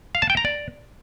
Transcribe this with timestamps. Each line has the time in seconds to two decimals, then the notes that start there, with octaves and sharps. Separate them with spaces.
0.15 F5
0.22 A5
0.30 G5
0.37 A#5
0.45 D5